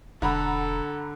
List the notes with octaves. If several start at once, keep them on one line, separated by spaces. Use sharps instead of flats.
E1 D3 A4 F#5 A#5 B5